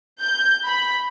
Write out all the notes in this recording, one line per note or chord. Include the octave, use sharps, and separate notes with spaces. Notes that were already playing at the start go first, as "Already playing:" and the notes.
G6
B5